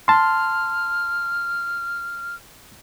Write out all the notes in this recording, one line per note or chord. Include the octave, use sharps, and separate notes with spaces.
A5 C6 F6